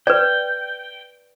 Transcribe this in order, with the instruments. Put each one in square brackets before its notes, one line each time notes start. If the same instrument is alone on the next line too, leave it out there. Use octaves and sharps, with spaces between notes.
[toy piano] B4 D5 [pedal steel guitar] G5